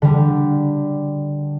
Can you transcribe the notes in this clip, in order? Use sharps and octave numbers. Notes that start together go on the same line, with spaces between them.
D3 G3